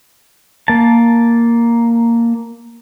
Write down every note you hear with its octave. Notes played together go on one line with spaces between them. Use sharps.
A#3 A5